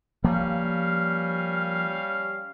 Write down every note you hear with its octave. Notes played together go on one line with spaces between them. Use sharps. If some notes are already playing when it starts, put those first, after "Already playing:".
F3 G3 A#3 C#4 F5